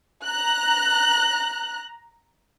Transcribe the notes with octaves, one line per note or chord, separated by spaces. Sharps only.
A#5 F#6